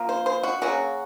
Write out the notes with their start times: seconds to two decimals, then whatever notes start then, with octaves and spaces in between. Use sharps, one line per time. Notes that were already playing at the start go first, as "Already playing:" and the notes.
Already playing: F3 A#3 F4
0.09 C5
0.26 C5
0.43 F#4
0.61 C#3 F#3 A#3 C#4 F#4